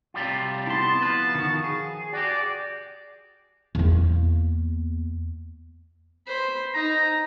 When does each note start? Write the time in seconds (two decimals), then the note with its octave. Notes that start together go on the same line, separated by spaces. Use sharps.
0.14 C3 G3 F4
0.67 B3 E4 A5 C6
1.01 F3 B4
1.35 D#3 F#4
1.64 G#4
2.13 F#4 G4 D5
3.75 E2 A#3
6.27 C5 B5
6.74 D#4 A#5